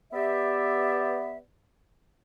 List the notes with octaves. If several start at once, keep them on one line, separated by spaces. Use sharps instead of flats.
B3 G4 D5 E5